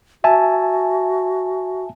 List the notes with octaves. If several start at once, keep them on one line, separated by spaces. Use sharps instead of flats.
F#4 E5 G#5 A5